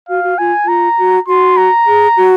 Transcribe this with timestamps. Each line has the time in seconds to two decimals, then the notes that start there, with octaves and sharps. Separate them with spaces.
0.09 F#4 F5
0.24 F#4
0.39 F4 G#5
0.65 F4 A#5
0.99 F#4
1.27 F#4 C6
1.57 A#5
1.87 G#4
2.17 F#4